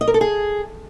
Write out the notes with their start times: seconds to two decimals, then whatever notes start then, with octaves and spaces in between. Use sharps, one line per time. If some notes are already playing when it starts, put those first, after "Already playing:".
0.01 D#5
0.08 A#4
0.14 A4
0.21 G#4